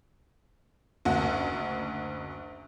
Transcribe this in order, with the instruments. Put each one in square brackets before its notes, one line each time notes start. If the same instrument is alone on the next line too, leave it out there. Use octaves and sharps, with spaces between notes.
[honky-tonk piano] F#1 D2 F#4